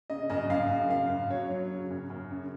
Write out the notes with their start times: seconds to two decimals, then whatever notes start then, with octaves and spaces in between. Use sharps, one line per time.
0.10 C#3 D#5
0.30 F#2 D#5
0.50 F#2 F5
0.70 C#3
0.90 F#2 F5
1.10 F#2
1.30 F#3 C#5
1.50 F#3
1.70 C#3
1.91 F#2
2.10 F#2
2.31 C#3